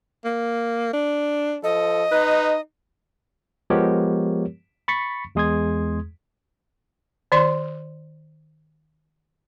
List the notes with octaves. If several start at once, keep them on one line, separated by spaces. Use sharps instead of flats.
A#3
D4
F3 A4 D#5
D#4 B4
F3 G#3 B3 G4 A#4 C#5
B5 C#6 A6 B6 C#7
E2 G#3 G#4 C6 D#6 G#6
D#3 D5 C6